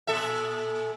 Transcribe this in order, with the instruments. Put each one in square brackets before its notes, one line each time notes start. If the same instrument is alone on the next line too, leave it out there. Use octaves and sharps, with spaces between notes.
[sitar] A#2 A4 E5